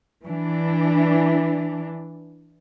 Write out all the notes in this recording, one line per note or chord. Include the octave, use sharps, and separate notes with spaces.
E3 D4